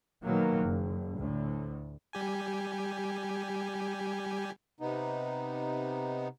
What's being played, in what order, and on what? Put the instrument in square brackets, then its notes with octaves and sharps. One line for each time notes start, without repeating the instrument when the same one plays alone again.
[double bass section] B2 D#3 F#3 A#3
F#1
D2 A2
[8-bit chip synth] G3 G4 G#5
[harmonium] C3 B3 D#4